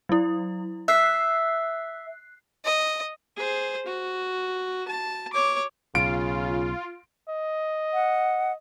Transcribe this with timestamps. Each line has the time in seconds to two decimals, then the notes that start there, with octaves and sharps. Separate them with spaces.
0.09 F#3 E4
0.88 E5 F#6 C7
2.65 D#5
3.36 G#4 C5
3.86 F#4
4.88 A5
5.33 C#5 D6
5.95 B1 C#3 F4 D7
7.29 D#5
7.94 F#5